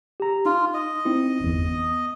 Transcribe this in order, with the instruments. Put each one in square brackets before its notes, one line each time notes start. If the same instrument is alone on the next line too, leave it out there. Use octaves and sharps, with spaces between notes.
[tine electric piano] G4 A#5
[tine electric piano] D#4 [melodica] F4
[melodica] D#5
[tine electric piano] C4 D#4 E4
G1 E2
B3